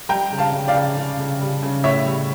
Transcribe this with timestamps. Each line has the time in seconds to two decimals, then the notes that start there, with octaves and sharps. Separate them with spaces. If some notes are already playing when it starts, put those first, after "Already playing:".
0.09 G3 G5 A#5
0.32 C#3
0.38 F5 A5
0.54 C#3
0.68 D5 F5
0.75 C#3
0.97 C#3
1.19 C#3
1.40 G3
1.63 C#3
1.84 A2 C#5 E5
2.06 G3